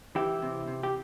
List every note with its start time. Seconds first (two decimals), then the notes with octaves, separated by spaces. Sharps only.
0.15 E3 E4 G4
0.42 C3
0.68 C3
0.83 G4